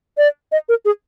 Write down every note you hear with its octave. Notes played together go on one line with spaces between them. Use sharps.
D5
D#5
A#4
G#4